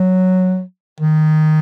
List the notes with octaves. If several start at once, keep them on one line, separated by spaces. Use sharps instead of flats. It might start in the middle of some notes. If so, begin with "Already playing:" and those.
Already playing: F#3
D#3